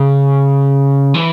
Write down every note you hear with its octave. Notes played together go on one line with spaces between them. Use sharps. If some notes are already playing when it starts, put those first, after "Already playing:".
Already playing: C#3
E3